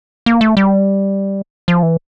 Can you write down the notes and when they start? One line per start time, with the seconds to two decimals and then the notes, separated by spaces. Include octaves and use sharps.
0.26 A#3
0.41 A3
0.57 G3
1.68 F3
1.83 E3